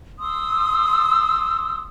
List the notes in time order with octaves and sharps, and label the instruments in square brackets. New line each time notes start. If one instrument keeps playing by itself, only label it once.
[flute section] C6 D#6 E6